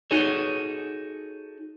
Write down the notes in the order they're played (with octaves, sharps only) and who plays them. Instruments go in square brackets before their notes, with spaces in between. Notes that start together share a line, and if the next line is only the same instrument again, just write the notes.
[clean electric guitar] D#4 F#4 G#4 A4 C#5